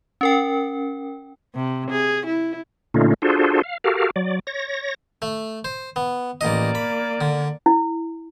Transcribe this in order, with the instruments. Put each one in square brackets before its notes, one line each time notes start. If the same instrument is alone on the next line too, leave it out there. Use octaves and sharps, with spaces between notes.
[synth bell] C#4 A#4 G5
[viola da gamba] C3
G#4
E4
[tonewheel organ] A#2 D3 A3 C#4 D#4 F4
D4 F4 F#4 G#4 A4 C5
F5
F#4 G4 A4 A#4 F5
F#3 D5
C#5 A#6
[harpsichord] A3
C5
B3
[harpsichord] A1 D#5 [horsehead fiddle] A#3 D5
[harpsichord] B5
D3
[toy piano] E4